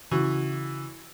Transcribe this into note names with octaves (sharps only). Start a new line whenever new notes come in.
C#3 E3 F#4